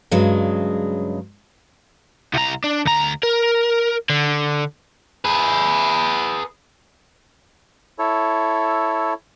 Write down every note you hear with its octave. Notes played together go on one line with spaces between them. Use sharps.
G2 C#3 F#3 G#3
C2 A#5
D4
D2 A#5
A#4
D3
G#4 B4
E4 A4 C#5